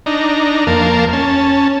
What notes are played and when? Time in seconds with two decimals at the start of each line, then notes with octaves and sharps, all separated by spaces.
0.06 D4 D#4 A#5
0.67 F2 A#3 A#4 F5 A5
1.13 C#4 A5